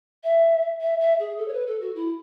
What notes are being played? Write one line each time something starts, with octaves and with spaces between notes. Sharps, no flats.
E5
E5
E5
G#4
A4
C#5
B4
A4
F#4
E4